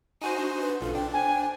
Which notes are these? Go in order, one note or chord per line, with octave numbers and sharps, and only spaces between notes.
D#4 F#4 C5 G#5
D4
B4
B1 F4 A4
D4 G5
C5 G5 G#5